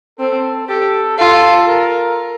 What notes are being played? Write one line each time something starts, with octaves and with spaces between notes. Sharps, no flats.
C4 A4
G4 A4
F4 A4
A#4